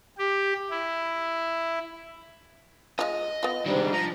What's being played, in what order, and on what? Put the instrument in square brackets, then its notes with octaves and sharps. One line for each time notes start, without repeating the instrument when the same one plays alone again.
[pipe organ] G4
E4
[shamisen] G#3 E4 F4 [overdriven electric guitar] D#5
[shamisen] B3 F4
[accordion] G#2 C3 G3 [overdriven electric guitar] D#3 D4
[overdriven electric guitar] F3 [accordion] A#5